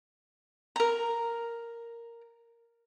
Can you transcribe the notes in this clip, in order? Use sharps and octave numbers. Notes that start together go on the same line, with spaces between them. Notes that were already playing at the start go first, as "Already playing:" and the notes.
A#4 A#5